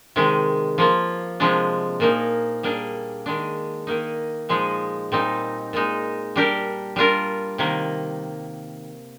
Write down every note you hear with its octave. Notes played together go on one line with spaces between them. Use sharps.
C3 D#3 G#3
F3 A#3 F4
C3 F3 G#3 D4
A#2 F3 A#3 D#4
G3 A#3 D4 G#4
D#3 G#3 D4
D#3 A#3 D#4
A#2 F3 G#3 D#4 G#4
A#2 G3 C4 D#4
A#2 G#3 D#4
G3 D4 G4 A#4
G3 D4 F4 A#4
C3 D#3 A#3